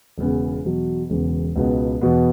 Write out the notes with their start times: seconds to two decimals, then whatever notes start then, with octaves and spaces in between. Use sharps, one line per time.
0.18 E1 E2 C#3
0.64 E2 B2 F#3
1.10 E1 E2 C#3
1.56 C#2 B2 B3
2.01 E2 B2 B3